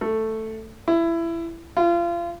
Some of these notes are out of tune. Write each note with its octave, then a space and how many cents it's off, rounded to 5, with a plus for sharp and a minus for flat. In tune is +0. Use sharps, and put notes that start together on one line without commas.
A3 +5
E4 +20
F4 -30